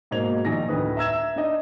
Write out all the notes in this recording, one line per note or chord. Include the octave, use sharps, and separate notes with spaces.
G#2 B2 A#3 C5 G#6 F7
A#1 D#3 D#4 A#6
D2 A2 D3 D#3 B4 D#6
E5 A#5 E6 G#6 E7
D4 D#4 D#5